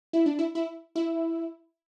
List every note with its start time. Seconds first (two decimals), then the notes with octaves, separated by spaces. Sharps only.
0.13 E4
0.26 D4
0.39 E4
0.55 E4
0.95 E4